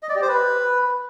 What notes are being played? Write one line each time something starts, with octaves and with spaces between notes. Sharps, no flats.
D#5
D5
G4
C5
B4